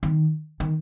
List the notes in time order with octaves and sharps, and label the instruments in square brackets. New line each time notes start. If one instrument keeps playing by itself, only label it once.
[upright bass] D#3
D#3